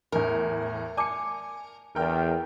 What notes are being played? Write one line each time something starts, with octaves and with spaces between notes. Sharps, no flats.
E2 A2 A#4
D5 G#5 A5 D6 C#7
E2 A#4 G5 F6